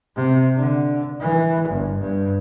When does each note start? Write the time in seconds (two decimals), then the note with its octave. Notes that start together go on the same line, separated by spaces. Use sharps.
0.16 C3
0.57 D3
1.21 E3
1.69 G1
2.01 G2